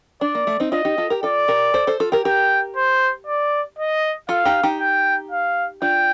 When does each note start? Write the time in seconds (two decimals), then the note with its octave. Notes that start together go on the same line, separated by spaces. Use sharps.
0.21 D4 D5
0.35 A#3
0.47 A3
0.60 C4 D#4
0.72 D4 F4 D#5
0.85 D#4 G4
0.98 F4 A4
1.10 G4 A#4
1.23 F4 A4 D5
1.48 G4 A#4
1.74 A4 C5
1.87 A4 C5
2.00 F4 A4
2.12 G4 A#4
2.25 G4 A#4 G5
2.76 C5
3.27 D5
3.79 D#5
4.29 F4 A4 F5
4.45 D#4 G4
4.63 D#4 G4
4.80 G5
5.31 F5
5.82 D4 F4 G5